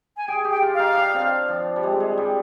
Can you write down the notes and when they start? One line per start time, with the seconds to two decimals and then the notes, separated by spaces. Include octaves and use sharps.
0.17 G#5
0.28 G#4 G5
0.45 G4
0.51 G5
0.62 F4
0.74 D#4 F5
0.97 D4
1.14 C4
1.48 F3
1.76 G3
1.83 G#3
2.00 G#3
2.18 G3